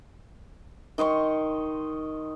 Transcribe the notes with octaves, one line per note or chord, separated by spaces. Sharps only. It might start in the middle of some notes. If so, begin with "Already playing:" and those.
D#3 D#5 C6 C#6